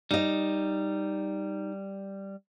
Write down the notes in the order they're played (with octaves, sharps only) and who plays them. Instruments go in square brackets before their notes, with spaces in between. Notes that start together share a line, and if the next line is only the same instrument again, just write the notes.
[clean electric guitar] G3 [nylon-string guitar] D#4 D#5